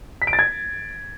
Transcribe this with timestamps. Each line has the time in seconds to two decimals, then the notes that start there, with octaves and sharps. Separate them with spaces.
0.22 B6
0.27 D7
0.33 A6
0.39 G#6